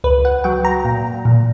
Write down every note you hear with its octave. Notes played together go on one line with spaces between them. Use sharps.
C#2 B4
F#5
F#3 G5
A#5
A#2
A#2